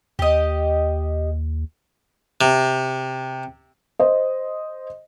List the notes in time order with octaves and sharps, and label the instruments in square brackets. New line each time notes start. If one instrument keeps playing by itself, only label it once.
[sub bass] D#2 [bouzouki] G4 D#5
[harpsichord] C3
[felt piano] C5 D#5